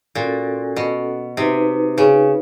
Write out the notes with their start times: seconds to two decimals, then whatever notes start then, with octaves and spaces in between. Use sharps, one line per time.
0.15 A#2 C#4 F#4 A4
0.76 B2
1.37 C3 D#4 F#4 B4
1.98 C#3